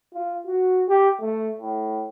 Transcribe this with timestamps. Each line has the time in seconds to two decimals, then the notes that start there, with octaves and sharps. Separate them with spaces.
0.14 F4
0.47 F#4
0.88 G4
1.20 A3
1.60 A2